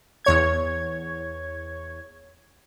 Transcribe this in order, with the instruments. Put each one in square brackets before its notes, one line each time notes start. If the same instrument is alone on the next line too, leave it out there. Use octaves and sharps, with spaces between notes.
[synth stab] E2 C#5 G#6